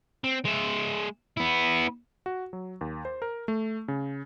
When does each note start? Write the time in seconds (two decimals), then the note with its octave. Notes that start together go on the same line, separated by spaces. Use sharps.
0.24 C4
0.45 G#3 E5
1.37 B3 E4
2.26 F#4
2.53 F#3
2.81 D#2
3.05 C5
3.22 A#4
3.48 A3
3.88 C#3